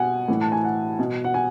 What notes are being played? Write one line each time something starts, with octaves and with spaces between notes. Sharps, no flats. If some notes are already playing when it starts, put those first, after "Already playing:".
Already playing: B2 F#5 G#5
A2 E3
A5
G#5
F#5
B2
F#5
G#5